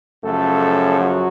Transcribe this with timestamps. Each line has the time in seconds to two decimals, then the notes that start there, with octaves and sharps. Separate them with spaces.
0.24 F#2 C#3 F3 A3 A4
0.99 F#3 F#4